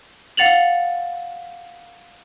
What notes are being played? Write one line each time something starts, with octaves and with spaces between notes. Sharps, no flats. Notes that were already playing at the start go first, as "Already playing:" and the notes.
F5 F#5 A6 F7 F#7